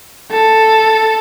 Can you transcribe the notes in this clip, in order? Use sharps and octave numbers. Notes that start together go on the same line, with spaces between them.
A4